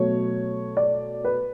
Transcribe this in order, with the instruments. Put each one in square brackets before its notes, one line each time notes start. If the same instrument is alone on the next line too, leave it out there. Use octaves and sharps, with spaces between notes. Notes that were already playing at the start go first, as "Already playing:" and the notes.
Already playing: [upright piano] B2 F#3 A3 C#5
D5
B4